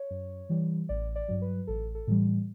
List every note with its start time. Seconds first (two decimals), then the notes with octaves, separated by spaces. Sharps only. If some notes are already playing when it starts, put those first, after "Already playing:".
Already playing: C#5
0.10 F#2
0.49 E3 G3
0.89 A1 D5
1.16 D5
1.28 G2 F#3
1.42 B4
1.67 A1 A4
1.95 A4
2.07 A2 E3 G3